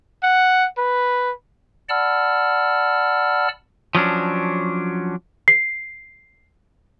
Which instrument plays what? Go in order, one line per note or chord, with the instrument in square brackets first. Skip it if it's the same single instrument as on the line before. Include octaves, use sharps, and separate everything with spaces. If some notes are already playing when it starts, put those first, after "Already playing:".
[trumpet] F#5
B4
[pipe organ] D5 F#5 A5 B5 E6 F6
[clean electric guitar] F3 F#3 C#4 D4
[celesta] C7